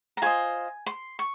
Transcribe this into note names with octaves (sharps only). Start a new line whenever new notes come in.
A#5
F4 C5 D#5 G#5
C6
C#6